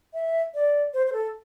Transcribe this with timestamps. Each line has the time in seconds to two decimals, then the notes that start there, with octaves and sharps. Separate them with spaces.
0.14 E5
0.54 D5
0.94 C5
1.07 C5
1.13 A4